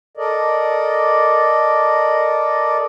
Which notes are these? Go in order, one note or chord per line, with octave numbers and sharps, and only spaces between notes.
A4 A#4 D5 D#5